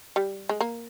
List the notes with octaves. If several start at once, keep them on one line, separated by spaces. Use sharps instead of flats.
G3
G#3
A#3